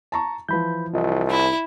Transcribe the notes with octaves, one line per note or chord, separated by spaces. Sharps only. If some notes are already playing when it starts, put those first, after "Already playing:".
A5 A#5 C#6
E3 F3 B4 B5 G6
C2 F4 D#5
E4